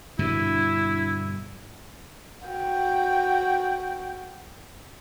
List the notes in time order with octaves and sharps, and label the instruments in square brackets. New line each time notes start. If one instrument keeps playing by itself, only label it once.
[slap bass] G2 B2 D3 [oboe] E4
[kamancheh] F#4 G5